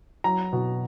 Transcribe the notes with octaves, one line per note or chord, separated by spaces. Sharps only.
F#3 A#5
B2